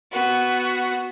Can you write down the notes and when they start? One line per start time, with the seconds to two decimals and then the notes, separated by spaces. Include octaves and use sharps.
0.12 B3 F#4